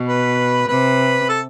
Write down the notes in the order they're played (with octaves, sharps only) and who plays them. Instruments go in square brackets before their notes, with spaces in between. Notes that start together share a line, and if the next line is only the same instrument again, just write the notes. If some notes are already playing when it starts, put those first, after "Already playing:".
Already playing: [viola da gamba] B2
[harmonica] B4
[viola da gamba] C3 [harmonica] B4
[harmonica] A4